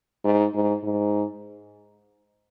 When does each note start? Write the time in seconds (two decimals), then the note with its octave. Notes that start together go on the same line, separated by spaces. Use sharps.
0.24 G#2
0.54 G#2
0.83 G#2